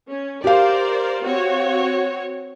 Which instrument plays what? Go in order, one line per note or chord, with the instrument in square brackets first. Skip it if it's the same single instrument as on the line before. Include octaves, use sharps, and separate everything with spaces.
[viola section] C#4
[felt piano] G4 F5 [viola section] A#4 C5 D5
[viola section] C4 F#4 C#5